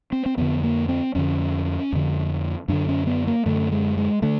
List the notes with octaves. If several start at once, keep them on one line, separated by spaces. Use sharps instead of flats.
C4
C4
F2 D3 B3
A#3
C4
F2 D3 C#4
F2 D3
F#2 D3 D4
C#4
B3
A#3
F#2 D3 A3
G#3
G#3
D3 A3